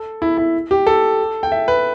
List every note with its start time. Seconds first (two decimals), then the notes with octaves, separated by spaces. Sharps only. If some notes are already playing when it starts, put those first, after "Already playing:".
Already playing: A4
0.22 E4
0.37 E4
0.71 G4
0.87 A4
1.43 G5
1.52 E5
1.68 B4